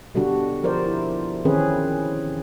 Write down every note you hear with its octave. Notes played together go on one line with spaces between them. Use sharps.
B2 D3 G3 D4 F#4
F3 A#4 C5 D5
E4
D#3 E3 C4 C#4 G#4 B4